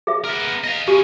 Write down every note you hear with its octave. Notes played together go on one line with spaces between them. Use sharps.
G#4 E5
B3 A#4
D#5 F5
D3 C#4 G4